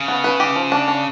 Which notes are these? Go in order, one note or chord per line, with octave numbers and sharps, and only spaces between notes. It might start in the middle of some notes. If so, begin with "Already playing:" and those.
Already playing: C#3
B3
B4
G4
F3
D4
D4